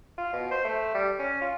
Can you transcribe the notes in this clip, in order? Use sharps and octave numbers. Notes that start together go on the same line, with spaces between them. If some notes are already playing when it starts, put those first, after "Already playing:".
F4
B2
C5
A3
G3
C#4
F4